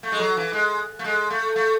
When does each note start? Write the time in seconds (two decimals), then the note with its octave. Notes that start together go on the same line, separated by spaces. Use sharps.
0.03 A3
0.12 G#3
0.20 F#3
0.37 E3
0.53 G#3
0.99 A3
1.04 G#3
1.30 A3
1.56 A3